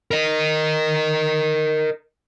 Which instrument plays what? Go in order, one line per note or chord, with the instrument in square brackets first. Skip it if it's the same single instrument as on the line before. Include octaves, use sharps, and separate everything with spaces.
[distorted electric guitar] A#4 D#5